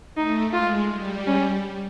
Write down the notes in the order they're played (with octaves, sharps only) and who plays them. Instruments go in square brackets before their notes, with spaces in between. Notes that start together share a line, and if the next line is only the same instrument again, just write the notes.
[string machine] A3 [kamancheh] D#4
[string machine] G#3 [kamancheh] F4
[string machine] G3
[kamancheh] C#4